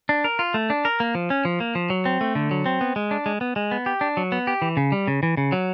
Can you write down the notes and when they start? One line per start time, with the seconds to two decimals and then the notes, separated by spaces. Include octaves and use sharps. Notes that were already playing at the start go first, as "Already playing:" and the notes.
0.09 D4
0.24 A#4
0.39 F4
0.54 A3
0.70 D4
0.85 A#4
1.00 A#3
1.15 F3
1.30 C#4
1.45 F3
1.60 A#3
1.75 F3
1.90 F#3
2.05 C4
2.21 A3
2.35 D3
2.51 F#3
2.66 C4
2.81 B3
2.96 G#3
3.11 D4
3.26 G#3
3.41 B3
3.56 G#3
3.71 B3
3.86 G4
4.01 D4
4.17 F#3
4.32 B3
4.47 G4
4.62 E3
4.77 C#3
4.92 G3
5.08 C#3
5.23 E3
5.37 C#3
5.52 F#3